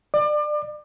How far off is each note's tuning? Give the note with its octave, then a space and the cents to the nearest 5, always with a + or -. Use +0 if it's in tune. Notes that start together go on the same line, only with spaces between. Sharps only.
D5 +25 D6 +35